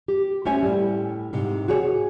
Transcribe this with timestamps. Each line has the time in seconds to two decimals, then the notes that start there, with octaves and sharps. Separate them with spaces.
0.08 G4
0.45 A3 C#4 C5 C#5 E5 G#5
0.63 A2 G3
1.33 G#2 C3
1.68 F#4 G#4 C#5